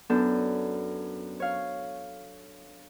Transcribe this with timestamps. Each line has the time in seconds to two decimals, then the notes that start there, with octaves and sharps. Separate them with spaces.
0.09 F#2 B3 D4 A4 G6
1.40 C#5 F5